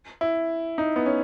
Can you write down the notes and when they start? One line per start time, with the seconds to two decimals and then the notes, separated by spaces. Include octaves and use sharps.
0.21 E4
0.78 D#4
0.96 B3
1.06 C#4